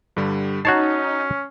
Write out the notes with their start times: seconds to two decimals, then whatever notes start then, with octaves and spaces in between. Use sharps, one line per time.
0.16 G2 D3 G3
0.65 C#4 D#4 F#4 C#5 A5 C7